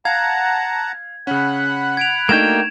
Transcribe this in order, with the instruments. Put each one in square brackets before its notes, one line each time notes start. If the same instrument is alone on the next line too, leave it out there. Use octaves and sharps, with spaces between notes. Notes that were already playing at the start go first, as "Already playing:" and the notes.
[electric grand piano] F5 [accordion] F#5 A5 A#5 [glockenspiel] G#6
[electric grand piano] C#3 C#4 [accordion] F#5 B5 F#6
[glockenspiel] G#6 D7 F7
[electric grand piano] A3 D4 D#4 [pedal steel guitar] A#3 F#4 G5 [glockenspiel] G#6 E7